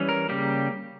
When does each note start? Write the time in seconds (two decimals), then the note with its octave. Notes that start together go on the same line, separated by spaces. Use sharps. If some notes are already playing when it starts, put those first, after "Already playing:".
Already playing: E3 G3 C#4
0.09 A#4
0.29 C#3 G3 A#3 G4